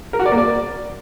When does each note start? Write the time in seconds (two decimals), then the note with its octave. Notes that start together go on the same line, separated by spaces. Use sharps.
0.13 A#4
0.19 F#4
0.26 D5
0.32 A#3
0.38 D5